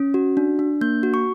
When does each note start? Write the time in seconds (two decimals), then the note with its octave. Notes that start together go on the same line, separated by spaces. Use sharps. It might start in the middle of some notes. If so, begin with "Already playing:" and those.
Already playing: C#4
0.14 F#4
0.37 D4
0.59 D4
0.81 A#3 G6
1.03 F#4
1.14 C#6